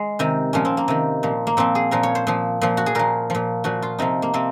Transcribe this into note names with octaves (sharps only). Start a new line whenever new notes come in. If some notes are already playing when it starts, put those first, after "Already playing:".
Already playing: G#3
C3 D#3
A#2 F3 C#4
C4
A#3
C3 D#3
A#2 F3
A#3
A#2 F3 C4
G#4
A#2 F3 A#4
C#5
C5
A#2 F3
A#2 F3
F#4
G#4
A#2 F3 A#4
A#2 F3
A#2 F3 F#4
F4
C3 F3 D#4
A#3
C3 F3 C4